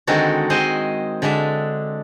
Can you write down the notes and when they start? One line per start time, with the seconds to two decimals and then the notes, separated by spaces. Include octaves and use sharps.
0.07 D3 D#3 G#3 C4 F#4 A4
0.50 G#3 C4 C5 D#5 G#5
1.22 D3 G#3 D4 E5